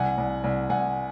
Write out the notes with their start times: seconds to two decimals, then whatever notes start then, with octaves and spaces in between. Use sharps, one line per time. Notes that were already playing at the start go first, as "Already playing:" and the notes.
Already playing: C2 F#5 G#5
0.18 C2
0.44 C2
0.69 C2 F#5 G#5